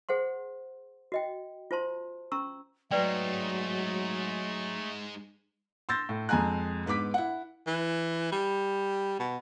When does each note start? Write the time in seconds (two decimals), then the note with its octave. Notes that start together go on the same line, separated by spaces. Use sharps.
0.09 G#4 C5 F#5 C6
1.12 F#4 D#5 G5
1.71 F4 C5 A5 C6
2.32 C#4 A#5 C#6 E6
2.91 F#3 G#3 A3 D#4 B4 D5 G5
5.89 C6 E6 G6 A6 A#6
6.09 A2
6.29 F2 G#3 G#5 A#5 F#6
6.86 G#2 B3 B4 D6 B6
7.14 E4 F#5
7.67 E3
8.32 G3
9.19 B2